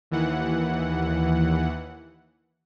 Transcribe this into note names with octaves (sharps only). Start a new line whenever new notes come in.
D#2 E3 F#5